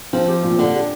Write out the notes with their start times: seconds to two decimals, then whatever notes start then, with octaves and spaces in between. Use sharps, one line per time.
0.13 F3 C4
0.28 G4
0.43 A#2
0.58 D3 D4
0.75 G4